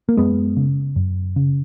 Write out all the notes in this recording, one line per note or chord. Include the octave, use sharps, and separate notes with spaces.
A#3
F#2 G#3 B3
C#3
F#2
C#3